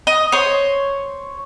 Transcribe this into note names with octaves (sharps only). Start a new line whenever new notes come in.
D#5
C5 C#5